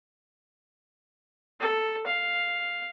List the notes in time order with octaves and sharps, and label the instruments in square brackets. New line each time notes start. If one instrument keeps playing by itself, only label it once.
[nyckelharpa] A4
F5